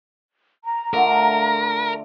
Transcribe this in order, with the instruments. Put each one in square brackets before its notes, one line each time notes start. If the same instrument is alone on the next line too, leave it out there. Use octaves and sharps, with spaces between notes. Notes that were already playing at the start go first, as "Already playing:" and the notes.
[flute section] A#5
[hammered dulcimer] D3 A3 F4 [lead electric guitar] A#4